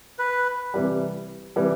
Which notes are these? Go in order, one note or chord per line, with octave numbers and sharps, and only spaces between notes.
B4
C3 E3 G3
C3 E3 G3